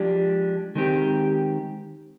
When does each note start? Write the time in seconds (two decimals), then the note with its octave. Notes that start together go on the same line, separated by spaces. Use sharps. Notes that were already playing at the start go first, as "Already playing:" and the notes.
Already playing: F3 G#3 D4 G4
0.75 D#3 G#3 C4 G4